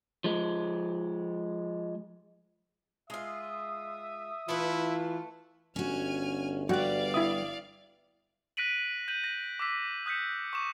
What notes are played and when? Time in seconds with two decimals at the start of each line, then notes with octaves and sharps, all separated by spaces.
0.24 F3 G#3
3.10 G#3 F4 E5 D#6
4.49 E3 A3 E4 F4 B4
5.76 G1 C#4 F#4 G#5 F6
6.69 G3 B3 F#4 D5 F5 F#5
7.14 E4 E5 D#6
8.57 F#6 A#6 B6 D7 D#7 F#7
9.08 G6 D#7 F#7
9.24 A#6
9.60 D6 E6 B6
10.06 D#6 F#6 G6 B6 C#7
10.53 C#6 D6 E7